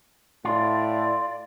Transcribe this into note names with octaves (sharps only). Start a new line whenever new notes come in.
A2 F4 D5